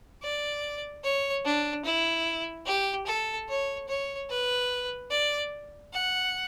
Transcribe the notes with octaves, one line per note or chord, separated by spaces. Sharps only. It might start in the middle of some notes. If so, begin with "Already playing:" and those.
D5
C#5
D4
E4
G4
A4
C#5
C#5
B4
D5
F#5